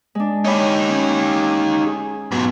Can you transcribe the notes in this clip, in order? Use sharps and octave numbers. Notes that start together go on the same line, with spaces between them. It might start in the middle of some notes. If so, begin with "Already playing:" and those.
G#3 D4
D#4 G4 C#5 B5
C#4
G#4
G#2 B2 F#3 F4